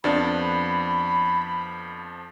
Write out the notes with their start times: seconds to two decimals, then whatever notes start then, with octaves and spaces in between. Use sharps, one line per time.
0.04 F2 F3 B3 D4 D5 B5